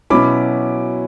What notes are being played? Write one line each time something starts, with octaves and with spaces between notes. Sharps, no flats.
B2 F#3 C#4 E4 B5 D6